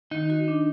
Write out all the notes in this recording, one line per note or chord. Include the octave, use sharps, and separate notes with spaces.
D#3 D#4
F#4
D4